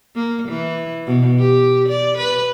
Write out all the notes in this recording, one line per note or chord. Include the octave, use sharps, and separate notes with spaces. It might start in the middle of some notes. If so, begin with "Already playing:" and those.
A#3
E3
B2
G4
D5
B4